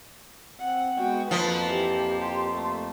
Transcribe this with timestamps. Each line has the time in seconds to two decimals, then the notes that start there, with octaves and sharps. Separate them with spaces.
0.59 C4 F#5
0.97 G#3 B3 F#4 G5
1.31 F2 F3 A#3 B4
1.69 E3 G4 A5
2.19 G4 C6
2.55 A3